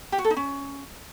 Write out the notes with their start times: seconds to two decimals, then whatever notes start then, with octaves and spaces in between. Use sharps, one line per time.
0.12 G4
0.18 F#4
0.24 A4
0.30 D#4
0.37 C#4